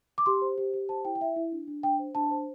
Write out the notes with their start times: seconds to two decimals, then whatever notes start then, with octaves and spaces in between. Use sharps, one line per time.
0.18 D6
0.26 G4 C6
0.42 C5
0.58 G4
0.74 G4
0.89 C5 A5
1.05 E4 G5
1.15 G5
1.21 E4 E5
1.36 E4
1.52 D4
1.67 D4
1.83 D4 G5
1.99 C5
2.15 D4 A5
2.31 C5